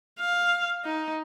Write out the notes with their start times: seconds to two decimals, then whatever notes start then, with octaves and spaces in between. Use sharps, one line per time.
0.19 F5
0.85 D#4